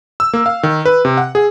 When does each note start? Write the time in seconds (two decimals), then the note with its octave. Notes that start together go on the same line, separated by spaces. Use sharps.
0.20 E6
0.33 A#3
0.46 F5
0.63 D#3
0.85 B4
1.05 C3
1.17 F#5
1.35 G#4